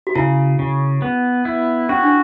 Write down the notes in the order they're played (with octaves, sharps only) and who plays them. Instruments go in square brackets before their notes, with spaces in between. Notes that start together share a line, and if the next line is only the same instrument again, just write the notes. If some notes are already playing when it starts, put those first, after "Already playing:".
[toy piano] F#4
[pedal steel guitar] C#3 [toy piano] E4
[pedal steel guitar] C#3
B3
E4
[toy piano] C#4 [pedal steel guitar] F#4
[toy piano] D4